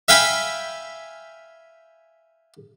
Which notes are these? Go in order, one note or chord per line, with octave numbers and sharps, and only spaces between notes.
E5 F5 G5 G#5 B5